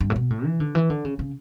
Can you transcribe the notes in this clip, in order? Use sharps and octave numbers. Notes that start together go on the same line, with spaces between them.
G2
A2
B2
A2
E3
D3
E3
D3
C#3
C#3